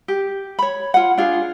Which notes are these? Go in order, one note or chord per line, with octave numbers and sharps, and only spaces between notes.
G4
C#5 B5
F4 F#5
D4 F4 G#4